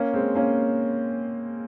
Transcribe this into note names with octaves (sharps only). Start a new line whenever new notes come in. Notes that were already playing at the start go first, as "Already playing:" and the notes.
Already playing: A#3 C#4
G#3 C4
A#3 C#4